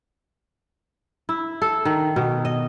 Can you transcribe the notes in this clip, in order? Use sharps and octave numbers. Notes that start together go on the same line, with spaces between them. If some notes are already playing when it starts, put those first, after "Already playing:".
E4
A4
D#3
B2
D#5